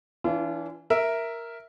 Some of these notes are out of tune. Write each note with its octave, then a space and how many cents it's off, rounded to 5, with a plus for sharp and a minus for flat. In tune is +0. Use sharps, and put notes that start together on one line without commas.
E3 +0 D4 -35 F4 -40
A#4 +0 E5 +0